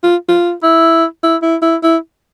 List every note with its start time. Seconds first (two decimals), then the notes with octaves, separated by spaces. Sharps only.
0.03 F4
0.28 F4
0.63 E4
1.23 E4
1.42 E4
1.62 E4
1.83 E4